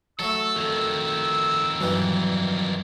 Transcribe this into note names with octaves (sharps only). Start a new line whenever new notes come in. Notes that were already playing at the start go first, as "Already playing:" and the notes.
F#3 A3 A4 E6
F2 D#3 A4
G2 E3 F#3 G3